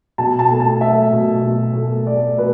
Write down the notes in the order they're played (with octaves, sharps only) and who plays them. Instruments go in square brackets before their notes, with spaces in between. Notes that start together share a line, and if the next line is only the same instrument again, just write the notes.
[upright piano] B2 A5
A5
A3
A5
A3 E5
B2
B2
A3
A3 D5
B2 B4